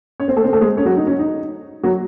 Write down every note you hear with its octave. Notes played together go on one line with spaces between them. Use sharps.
C#4 C#5
C4 C5
A3 A4
C4 C5
A3 A4
G#3 G#4
C#4 C#5
F#3 F#4
D#4
C#4
D#4
F#3 F#4